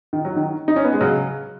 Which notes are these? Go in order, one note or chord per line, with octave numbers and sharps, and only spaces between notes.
D#3
F#3
D#3
D#4
C#4
B3
G#3
C#3 F#3